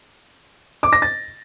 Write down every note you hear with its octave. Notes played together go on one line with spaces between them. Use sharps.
D6
A#6
A6